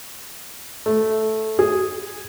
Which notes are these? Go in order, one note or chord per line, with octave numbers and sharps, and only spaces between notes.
A3
G#4